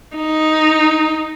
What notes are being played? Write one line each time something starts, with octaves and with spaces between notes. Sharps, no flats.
D#4